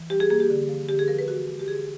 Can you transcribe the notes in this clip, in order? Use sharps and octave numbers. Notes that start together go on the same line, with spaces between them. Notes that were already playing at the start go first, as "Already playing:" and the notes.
Already playing: E3
G3 G4
G#4
A#3 G#4
G4
D3
F3
D3 G4
G#4
F3 A#4
B4
E3 F#4
G#3
G4
D3 G#4